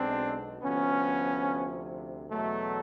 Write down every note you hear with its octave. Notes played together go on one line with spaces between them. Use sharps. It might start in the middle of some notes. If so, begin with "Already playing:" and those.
Already playing: B1 B2 G#3 C4 D4
D2 C3 F3 B3 C#4
E2 B2 F#3 A3